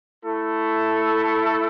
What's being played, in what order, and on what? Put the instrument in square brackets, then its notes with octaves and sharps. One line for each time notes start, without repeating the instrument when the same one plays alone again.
[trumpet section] A3 E4 A4